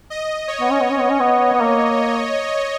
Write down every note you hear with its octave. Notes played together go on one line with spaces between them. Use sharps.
D#5
C#5
B3
C#4
B3
C#4 C#5
B3
C#4
B3
B3
A#3